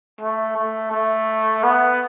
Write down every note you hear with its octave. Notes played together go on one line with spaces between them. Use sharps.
A3
A3
A3
B3